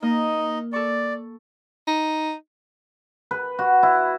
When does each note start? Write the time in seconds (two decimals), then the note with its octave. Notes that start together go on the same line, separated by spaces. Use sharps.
0.02 A#3 D#4 D#5
0.73 A4 D5 C#6
1.87 D#4
3.31 B4
3.59 F#4
3.83 E4